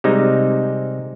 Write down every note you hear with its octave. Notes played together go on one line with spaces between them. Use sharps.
C3 G3 G#3 D#4